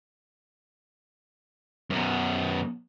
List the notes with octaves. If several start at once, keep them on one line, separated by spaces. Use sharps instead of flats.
F#2 B2